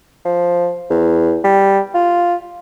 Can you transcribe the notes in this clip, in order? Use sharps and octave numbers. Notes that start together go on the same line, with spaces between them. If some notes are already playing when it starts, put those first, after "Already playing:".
F3
E2
G3
F4